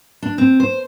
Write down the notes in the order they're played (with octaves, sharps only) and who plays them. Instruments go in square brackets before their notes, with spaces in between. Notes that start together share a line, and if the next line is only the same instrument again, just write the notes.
[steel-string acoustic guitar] D4
C4
C5